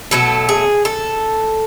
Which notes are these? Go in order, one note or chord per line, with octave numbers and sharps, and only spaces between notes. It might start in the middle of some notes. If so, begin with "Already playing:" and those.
B2 F#3 A3 A4
G#4
A4